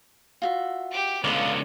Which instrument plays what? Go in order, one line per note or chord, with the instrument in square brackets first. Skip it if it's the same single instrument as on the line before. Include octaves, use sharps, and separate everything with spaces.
[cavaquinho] F4 F#4 E5
[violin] G4 D6
[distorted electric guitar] C#2 D3 [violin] B3 D#6 [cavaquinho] D5 D#5 F5